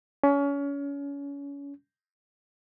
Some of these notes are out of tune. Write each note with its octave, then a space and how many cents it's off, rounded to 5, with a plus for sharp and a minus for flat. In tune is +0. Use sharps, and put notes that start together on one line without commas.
C#4 +30